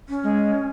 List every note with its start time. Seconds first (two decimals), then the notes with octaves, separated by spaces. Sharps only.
0.09 C#4
0.24 G#3